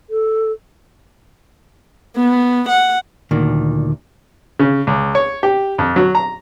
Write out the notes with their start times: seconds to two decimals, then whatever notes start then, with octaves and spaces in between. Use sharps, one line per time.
0.10 A4
2.16 B3
2.69 F#5
3.31 D2 A#2 D#3
4.59 C#3
4.87 C#2
5.15 C#5
5.43 G4
5.78 F2
5.96 F#3
6.15 A#5